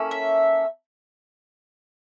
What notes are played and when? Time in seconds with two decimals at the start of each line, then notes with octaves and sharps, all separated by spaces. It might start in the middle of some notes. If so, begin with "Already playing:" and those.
Already playing: A#3 C#4 E4 A4
0.11 E5